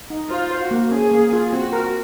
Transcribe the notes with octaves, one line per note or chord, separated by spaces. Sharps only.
D#4
F4 C5
C5
F#4
A#3
C#4 G#4
A#3
F4
C4 F#4
A#4